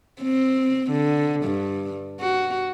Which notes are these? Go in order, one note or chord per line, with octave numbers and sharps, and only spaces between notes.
C4
D3
G2
F#4